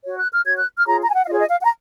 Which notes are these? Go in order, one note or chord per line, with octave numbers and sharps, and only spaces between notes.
F#4 C#5
F#6
F6
F#4 C#5 G#6
F#6
F6
F4 G#4 C#5 A#5
A#5
G#5
F#5
F5
F4 G#4 C#5 D#5
D#5
F5
F#5
A#5